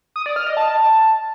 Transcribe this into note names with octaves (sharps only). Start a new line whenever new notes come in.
D#6
D5
F6
D#5
A5